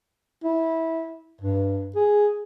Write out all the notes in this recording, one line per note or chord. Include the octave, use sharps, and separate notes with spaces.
E4
G2
G#4